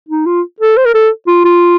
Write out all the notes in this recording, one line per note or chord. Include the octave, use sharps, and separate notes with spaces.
D#4
F4
A4
C5
A#4
A4
F4
F4